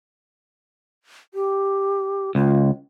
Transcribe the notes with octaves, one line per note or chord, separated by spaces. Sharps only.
G4
C#2 F4